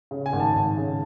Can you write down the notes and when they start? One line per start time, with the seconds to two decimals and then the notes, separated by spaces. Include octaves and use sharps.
0.11 C#3
0.26 G#5
0.33 G#1
0.40 A5
0.55 G#1
0.77 C#3